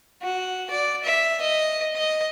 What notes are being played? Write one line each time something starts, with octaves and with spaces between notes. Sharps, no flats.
F#4
D5
E5
D#5
D#5